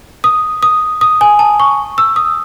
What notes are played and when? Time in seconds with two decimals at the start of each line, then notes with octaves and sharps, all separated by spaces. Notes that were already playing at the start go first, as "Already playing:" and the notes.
0.24 D#6
0.63 D#6
1.01 D#6
1.21 G#5
1.39 A5
1.60 C#6
1.98 E6
2.16 D#6